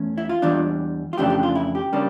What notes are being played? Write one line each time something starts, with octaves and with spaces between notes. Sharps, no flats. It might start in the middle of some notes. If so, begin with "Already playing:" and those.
Already playing: E2 A3 C#4
E4
F4
E2 E3 G3 D4
F4
F2 C#3 E3 A3 D4 G4
G4
F4
E4
G4
C#3 G3 A#3 D4